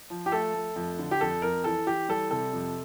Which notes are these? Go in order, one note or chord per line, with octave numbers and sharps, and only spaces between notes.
F3
G4
A3 A4
A3
F2
D3
G4
F2 A4
F2 A#4
E3 A4
E3 G4
G3 A4
C3 A4
F2